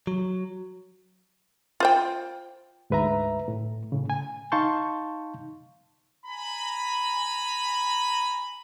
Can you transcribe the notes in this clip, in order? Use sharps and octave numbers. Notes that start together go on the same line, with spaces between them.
F#3
F4 C5 G5
D2 G#2 B4 E5 A#5
A2
A2 C#3
G#5
D#4 F5 A5 C6 C#6 G6
G#5 A#5 B5